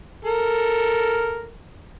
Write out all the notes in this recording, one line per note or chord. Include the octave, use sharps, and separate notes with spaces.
A4 A#4